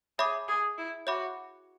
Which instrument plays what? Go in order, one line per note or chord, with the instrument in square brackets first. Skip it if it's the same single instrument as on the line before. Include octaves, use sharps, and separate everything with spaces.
[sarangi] G#4 [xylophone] C#5 E5 B5 D6
[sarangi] G#4
E4
[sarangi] F#4 [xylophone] C#5 E5 B5 D6